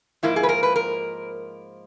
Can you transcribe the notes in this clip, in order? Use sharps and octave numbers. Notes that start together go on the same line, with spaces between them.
G#2 F3 A#3 E4
G#4
B4
A#4
B4
A#4